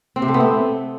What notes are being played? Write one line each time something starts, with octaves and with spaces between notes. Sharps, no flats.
C4
C3
A3
B3
C4